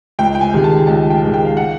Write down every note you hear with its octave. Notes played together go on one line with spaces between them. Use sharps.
C#2 G5
G5
G#5
C3 D#3 G#3
A5
C#2 A5
G5
C3 D#3 G#3
G5
F5
F#5